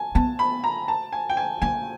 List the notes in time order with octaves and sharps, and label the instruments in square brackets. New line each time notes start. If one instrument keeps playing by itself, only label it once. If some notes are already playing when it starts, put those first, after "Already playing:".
Already playing: [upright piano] G#5 A5
[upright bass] B3 [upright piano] A5
[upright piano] B5
A#5
A5
G#5
G5
G#5
[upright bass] A#3 [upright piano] G#5